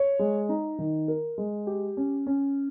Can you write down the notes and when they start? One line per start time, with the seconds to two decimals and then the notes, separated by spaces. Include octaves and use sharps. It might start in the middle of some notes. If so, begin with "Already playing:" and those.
Already playing: C#5
0.19 G#3
0.49 D#4
0.79 D#3
1.08 A#4
1.38 G#3
1.67 G4
1.97 C#4
2.27 C#4